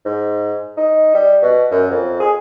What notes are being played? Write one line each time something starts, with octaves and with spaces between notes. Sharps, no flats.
G#2
D#4
G3
B2
F#2
F2
G#4